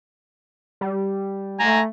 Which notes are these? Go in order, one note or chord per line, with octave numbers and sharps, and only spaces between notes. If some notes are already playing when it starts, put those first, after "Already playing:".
G3
A3 G#5 A#5